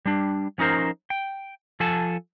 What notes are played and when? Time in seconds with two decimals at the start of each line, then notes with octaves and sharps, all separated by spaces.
0.06 G3 D4
0.58 F3 C#4 D#4 A#4 C5
1.10 G5
1.80 F3 A4 G#5 A5